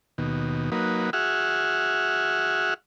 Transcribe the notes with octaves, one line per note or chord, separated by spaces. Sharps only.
D#2 B2
F#3 A#3 D#4 B4
F#4 G#4 E5 F#5 F6